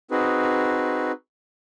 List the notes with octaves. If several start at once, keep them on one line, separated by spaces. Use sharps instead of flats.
C4 D#4 F#4 G#4 B4